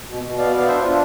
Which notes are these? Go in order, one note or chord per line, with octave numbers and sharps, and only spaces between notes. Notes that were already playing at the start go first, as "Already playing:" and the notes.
B2
B2
B3 D5 F5
B3 D5 F5
D4 C5 E5
D4 F4